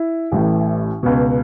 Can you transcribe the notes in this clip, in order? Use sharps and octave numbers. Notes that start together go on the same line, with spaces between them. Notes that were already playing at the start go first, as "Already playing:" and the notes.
Already playing: E4
A1 A2 E3
C#2 B2